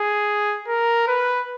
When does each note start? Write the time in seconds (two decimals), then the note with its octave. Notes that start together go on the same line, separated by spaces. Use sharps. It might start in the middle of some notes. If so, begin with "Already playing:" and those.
Already playing: G#4
0.68 A#4
1.08 B4